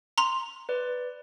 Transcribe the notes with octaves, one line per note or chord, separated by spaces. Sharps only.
A#5 C6 F7
B4 D5